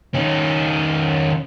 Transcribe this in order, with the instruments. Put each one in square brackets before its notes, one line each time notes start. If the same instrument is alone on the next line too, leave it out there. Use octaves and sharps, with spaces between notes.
[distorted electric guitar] D#3 C#4